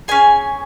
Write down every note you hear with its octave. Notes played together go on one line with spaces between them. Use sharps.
C#4 G#4 G#5